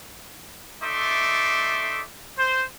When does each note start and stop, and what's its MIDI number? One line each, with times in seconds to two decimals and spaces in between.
0.82 2.01 57
0.82 2.01 63
0.82 2.01 74
0.82 2.01 76
0.82 2.01 84
0.82 2.01 86
2.38 2.63 72